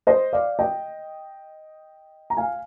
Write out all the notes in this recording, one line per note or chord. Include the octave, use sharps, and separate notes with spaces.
C5 D#5
D5 F5
D#5 G5
A#5
F5 G#5